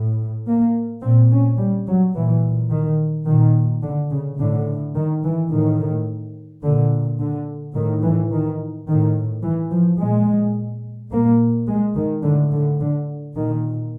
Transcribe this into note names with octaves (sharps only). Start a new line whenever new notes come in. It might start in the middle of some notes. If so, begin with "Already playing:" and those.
Already playing: A2
A#3
A#2 C4
C#4
G3
F#3
A#2 E3
D#3
A#2 D#3
D3
C#3
A2 D3
D#3
E3
A2 D#3
A#2 D3
D3
A2 D#3
E3
D#3
A2 D#3
E3
F3
A#2 G#3
A#2 A#3
G#3
D#3
A2 D3
D3
D3
A#2 D#3